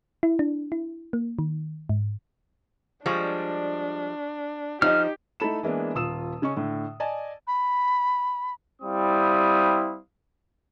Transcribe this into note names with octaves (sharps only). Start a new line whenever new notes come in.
E4
D4
E4
A#3
D#3
G#2
F3 G3 G#3 D4 C#6 F6
F3 D#4 G4 D#5 F6
A3 D#4 E4 A4 B5 E7
E3 G#3 A#3 B3 D4
D#1 F4 D#6 E6 E7
C#3 C#4 D#5 C#6
A2 D3
D5 D#5 G#5 A5
B5
G3 C4 E4 F5 D#6